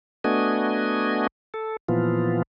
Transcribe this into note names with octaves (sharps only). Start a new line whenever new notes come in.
A3 B3 D4 F#4 D#5 G#5
A4
A#2 E3 F3 B3 F4